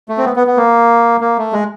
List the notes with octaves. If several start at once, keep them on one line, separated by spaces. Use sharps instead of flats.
A3
C4
B3
B3
B3
A#3
A#3
A3
G#3